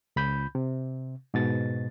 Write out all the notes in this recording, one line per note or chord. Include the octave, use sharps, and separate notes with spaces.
C#2 B5 G6
C3
G#2 B2 A6